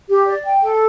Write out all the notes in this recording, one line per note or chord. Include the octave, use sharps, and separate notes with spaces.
G4
D5
G5
A4